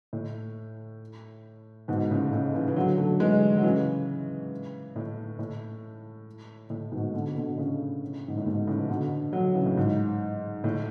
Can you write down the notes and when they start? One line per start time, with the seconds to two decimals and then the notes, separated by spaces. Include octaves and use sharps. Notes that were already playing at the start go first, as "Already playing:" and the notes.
0.13 A2
1.88 G#2 B2
2.10 A2 C#3
2.33 A2 C#3
2.54 C#3 E3
2.68 E3
2.76 D3 F#3
2.98 F#3 A3
3.20 E3 G#3
3.57 F#3
3.63 C#3 E3
4.96 A2
5.39 A2
6.70 A2
6.92 G#2 B2
7.14 B2 D3
7.36 B2 D3
7.57 A2 C#3
8.28 G#2
8.37 A2
8.45 G#2 B2
8.67 A2 C#3
8.79 E3
8.89 B2 D3
9.32 D3 F#3
9.55 C#3 E3
9.65 A2
9.77 G#2
10.64 A2